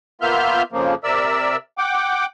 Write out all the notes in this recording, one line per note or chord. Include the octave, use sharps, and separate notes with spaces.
A#3 B3 F4 E5 F6 G6
F2 C#3 F3 A#3
C3 A#4 D5 E5 E6
F#5 G5 D6